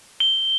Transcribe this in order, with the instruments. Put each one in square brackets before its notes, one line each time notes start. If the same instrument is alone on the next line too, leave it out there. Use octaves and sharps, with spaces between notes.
[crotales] G7